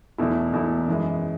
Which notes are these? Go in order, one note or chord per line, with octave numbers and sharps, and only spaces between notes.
E2 B2 A3 E4
E2 B2 A3 E4
F#2 E3 G#3